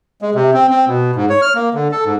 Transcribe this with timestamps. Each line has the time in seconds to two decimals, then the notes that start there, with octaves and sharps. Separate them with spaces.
0.22 G#3
0.35 C3
0.54 C4
0.70 C4
0.87 B2
1.16 G#2
1.29 C#5
1.42 F6
1.55 A#3
1.74 D3
1.92 A4
2.06 G#2